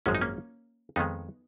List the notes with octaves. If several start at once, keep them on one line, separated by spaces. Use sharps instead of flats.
G#1 F#2 F3 G#3 C#4
D#4
A#3 C#4
F2 D#3 G#3 B3 D#4